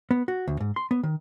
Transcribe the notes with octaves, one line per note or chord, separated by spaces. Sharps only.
B3
F#4
D2
G#2
C6
B3
D#3